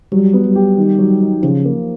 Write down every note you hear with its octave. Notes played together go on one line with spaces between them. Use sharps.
F#3 G3
B3
G3
G4
D#3
F#3
D#4
C#3 F3
A#3